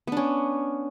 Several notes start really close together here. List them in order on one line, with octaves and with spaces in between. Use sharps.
B3 D4 C#4